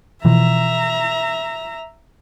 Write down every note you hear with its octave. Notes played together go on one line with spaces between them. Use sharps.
B2 E3 F3 E5 A#5